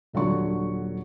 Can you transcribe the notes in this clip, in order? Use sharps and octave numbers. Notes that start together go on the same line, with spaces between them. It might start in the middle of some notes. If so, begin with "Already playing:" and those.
D#1 D3 F#3 C#6